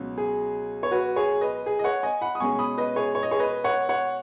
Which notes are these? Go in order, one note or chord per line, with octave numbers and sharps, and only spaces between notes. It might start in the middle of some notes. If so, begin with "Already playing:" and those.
Already playing: C#2 B2 F#3 C#4
G#4
C#5
F#4 B4
G#4 C#5
B4 D#5
G#4
D#5
C#5 F#5
D#5 G#5
F#5 B5
D#6
B2 G#3 C#4 G#5 C#6
B5 D#6
B4 D#5
G#4 C#5
C#5
D#5
G#4 C#5
B4 D#5
C#5 F#5
C#5 F#5